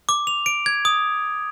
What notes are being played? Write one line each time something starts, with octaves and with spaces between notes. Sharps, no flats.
D6
F7
D7
G#6
D#6